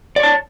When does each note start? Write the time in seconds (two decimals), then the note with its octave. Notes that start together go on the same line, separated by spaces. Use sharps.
0.16 D5
0.20 C#5
0.23 A5